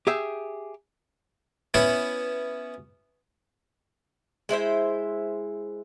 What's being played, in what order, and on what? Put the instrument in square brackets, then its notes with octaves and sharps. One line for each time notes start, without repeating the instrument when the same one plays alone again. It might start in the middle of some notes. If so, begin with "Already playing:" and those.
[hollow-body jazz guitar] G4 G#4 E5
[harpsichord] B3 C#4 E4 E5
[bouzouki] G#3 E4 C5 E5